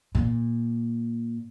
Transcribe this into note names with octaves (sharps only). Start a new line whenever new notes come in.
A#2